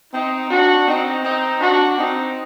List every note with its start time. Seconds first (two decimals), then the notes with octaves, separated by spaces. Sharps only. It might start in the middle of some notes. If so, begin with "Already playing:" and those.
0.13 C4 D#4
0.50 D4 F#4
0.87 C4 D#4
1.24 C4 D#4
1.61 D4 F#4
1.98 C4 D#4